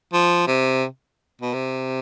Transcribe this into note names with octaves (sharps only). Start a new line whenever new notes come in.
F3
C3
B2
C3